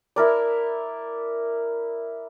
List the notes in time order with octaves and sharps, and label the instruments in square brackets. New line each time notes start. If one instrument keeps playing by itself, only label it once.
[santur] E4 A#4 D5